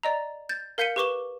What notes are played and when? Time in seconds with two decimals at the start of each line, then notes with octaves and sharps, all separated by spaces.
0.03 D5 D#5 A#5
0.49 G6 A6
0.78 A#4 F5 G6 B6 C#7 D#7
0.96 G4 B4 C#6 D6 E7 G7